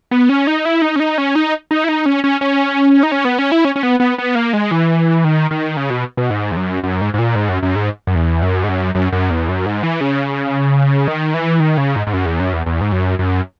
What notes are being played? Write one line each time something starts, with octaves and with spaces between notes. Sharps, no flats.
B3
C#4
D#4
E4
D#4
C#4
D#4
C#4
D#4
D#4
E4
D#4
C#4
C#4
C#4
D#4
C#4
B3
C#4
E4
C#4
C#4
B3
B3
B3
A#3
G#3
E3
D#3
D#3
C#3
B2
B2
G#2
E2
F#2
F#2
G#2
G#2
A#2
G#2
F#2
F#2
G#2
F#2
E2
F#2
G#2
F#2
F#2
F#2
E2
F#2
G#2
E3
C#3
D#3
E3
D#3
C#3
G#2
G#2
F#2
E2
F#2
E2
E2
G#2
F#2
F#2